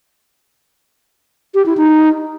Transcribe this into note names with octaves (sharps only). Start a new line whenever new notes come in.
G4
E4
D#4